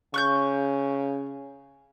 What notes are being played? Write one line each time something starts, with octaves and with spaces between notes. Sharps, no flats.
C#3 C#6 F#6 G6